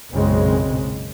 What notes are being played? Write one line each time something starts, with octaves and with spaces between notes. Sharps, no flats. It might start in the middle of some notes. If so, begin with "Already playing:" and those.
F#1 B1 A#2 C#3 G#3 C4